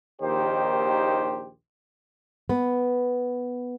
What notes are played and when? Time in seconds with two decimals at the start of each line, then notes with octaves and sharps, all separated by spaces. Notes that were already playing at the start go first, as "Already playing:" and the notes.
0.22 A#1 D#2 D#3 G4 C5
2.49 B3